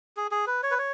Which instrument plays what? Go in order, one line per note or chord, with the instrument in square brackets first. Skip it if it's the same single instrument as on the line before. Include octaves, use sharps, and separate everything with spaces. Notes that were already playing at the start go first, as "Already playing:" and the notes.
[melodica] G#4
G#4
B4
C#5
B4
C#5